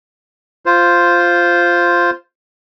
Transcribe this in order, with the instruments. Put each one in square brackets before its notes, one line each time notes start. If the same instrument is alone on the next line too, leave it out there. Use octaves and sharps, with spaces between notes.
[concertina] F4 C5